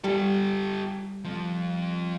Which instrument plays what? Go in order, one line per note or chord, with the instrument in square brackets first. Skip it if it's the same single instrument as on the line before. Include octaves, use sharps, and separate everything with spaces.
[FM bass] G3 [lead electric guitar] G4 A4
[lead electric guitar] F3 C4